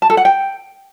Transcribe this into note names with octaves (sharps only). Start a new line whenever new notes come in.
A5
A4
F#5
G5